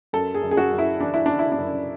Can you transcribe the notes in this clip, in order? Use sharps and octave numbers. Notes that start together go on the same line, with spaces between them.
F#2 A4
G#4
F#2
G#4
F#4
F#2
E4
E3 D4
E4
E3 D4
E4
D4
F#2